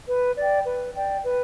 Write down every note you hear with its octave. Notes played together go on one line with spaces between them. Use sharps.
B4
D5
G5
B4
D5 G5
B4